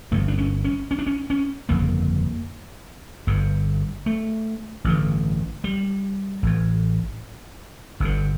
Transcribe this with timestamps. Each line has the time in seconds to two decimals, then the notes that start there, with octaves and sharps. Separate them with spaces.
0.12 G1 G2 D3 A3
0.28 D4
0.38 C#4
0.64 C#4
0.91 C#4
0.99 D4
1.06 C#4
1.30 C#4
1.69 G1 F2 C#3 A#3
3.27 G1 G2 D3
4.06 A3
4.84 A1 G2 D3
5.64 G3
6.43 A1 A2
8.00 G1 G2 D3